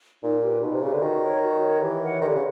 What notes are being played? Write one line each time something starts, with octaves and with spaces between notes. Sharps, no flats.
A#2 D#4
G4 B4
B2 D#4
C3
C#3 G4 B4
D3
D#3 F#4
A#4 C#5
F#4
A#4 C#5
E3 G4
A#4 C#5 F#5
D#3 G4
D3
C#3